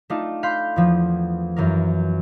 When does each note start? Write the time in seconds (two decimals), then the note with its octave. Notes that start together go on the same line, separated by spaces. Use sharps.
0.10 A3 D4 D#4 F4
0.43 F5 B5 C6 F#6 G6
0.76 E2 F3
1.56 F#2 E3 A#4